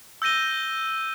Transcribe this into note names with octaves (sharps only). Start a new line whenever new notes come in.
E6 G6 A#6 D#7 G7